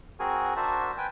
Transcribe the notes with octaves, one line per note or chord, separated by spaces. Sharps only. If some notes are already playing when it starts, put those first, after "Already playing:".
C4 F#4 G#4 A#4 G#5
D4 F#4 A#4 C5 E5 A5
B4 G5 G#5